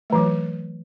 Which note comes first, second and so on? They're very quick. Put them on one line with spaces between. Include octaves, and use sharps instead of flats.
A3 E3 F#3